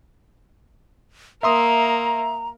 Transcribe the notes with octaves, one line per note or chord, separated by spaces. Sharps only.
A#3 E5 A#5 C6 D#6